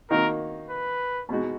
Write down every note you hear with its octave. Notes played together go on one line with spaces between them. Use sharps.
D#3 A#3 D#4 F#4 A#4
B4
B2 G#3 D#4 F#4